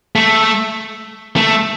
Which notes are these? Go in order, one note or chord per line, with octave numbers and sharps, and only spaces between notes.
A3
A3